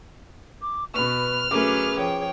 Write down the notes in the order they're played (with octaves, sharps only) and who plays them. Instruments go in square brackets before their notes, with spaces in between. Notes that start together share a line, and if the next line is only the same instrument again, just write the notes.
[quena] D6
[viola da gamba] B2 [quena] B4 [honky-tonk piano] B5 C#6 [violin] F6
[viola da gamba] F#3 C#4 B4 [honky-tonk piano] A3 A#4 D6 [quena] G#4
[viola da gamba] F3 [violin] C#5 G5